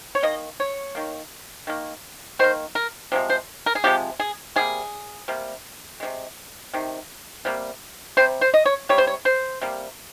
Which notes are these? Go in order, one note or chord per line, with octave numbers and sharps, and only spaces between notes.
C#5
D#3 A#3 D#5
C#5
D#3 A#3
D#3 A#3
D#3 A#3 C5
A#4
C3 F3 G#3
C5
A#4
G#4
C3 F3 G#3 G4
G#4
C3 G3 A#3 G#4
C3 G3 A#3
C3 D#3 G#3
C3 D#3
C3 G3 A#3
C3 G3 C5
C5
D#5
C#5
C3 G3 C#5
C5
C#5
C5
C3 G3 A#3